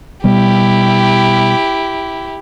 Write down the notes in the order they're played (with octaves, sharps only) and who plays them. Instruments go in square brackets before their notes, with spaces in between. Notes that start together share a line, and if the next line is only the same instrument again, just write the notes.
[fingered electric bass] B2 G3 B3 [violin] E4 G4